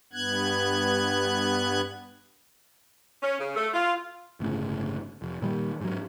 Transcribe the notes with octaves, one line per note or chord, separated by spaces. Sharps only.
G2 B3 F#6 G#6
C#4
C#3
A3
F4
G1 A2 C#3
F1
A#2 D#3 G3
G#2 F#3